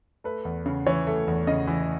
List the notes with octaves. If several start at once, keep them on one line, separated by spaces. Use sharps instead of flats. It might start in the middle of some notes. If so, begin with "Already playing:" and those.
A3 B4
E2
C#3
E3 C#5
A3
E2
C#3 D#5
E3